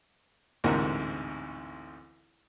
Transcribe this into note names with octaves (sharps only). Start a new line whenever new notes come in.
A1 D2 G#2 C3 A#4 F#5